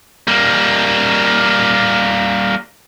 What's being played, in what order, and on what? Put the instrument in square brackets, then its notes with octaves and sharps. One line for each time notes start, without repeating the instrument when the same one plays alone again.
[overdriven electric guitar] G3 A#3